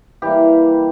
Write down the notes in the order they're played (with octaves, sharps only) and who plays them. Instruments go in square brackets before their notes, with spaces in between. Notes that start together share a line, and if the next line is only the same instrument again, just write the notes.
[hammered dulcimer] E3 G3 A#3 G4